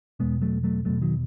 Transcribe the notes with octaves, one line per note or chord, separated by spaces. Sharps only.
E2 B2 G#3 B3
F#3 A3
F#3 A3
E2 B2 F#3 A3
D#3 F#3